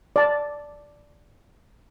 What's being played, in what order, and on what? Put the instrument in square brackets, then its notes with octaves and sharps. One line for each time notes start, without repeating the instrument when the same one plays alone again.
[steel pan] D5 A5